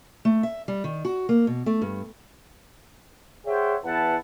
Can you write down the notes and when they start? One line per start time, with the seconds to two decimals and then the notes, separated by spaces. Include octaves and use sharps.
0.25 A3
0.43 E5
0.68 G3
0.84 D#3
1.05 F#4
1.29 A#3
1.47 B2
1.66 A3
1.82 G2
3.46 G#4 C5 C#5 E5 F#5 G5
3.84 E2 E4 B4 F#5 A5